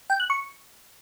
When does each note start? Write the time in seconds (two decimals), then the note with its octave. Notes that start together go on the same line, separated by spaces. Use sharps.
0.10 G5
0.20 F#6
0.30 C#6